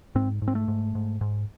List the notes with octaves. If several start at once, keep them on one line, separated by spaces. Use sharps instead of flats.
G#2 C4
G#2
C4
A3
G#2
G#2
G#2